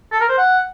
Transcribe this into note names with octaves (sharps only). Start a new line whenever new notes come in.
A4
A#4
C5
F#5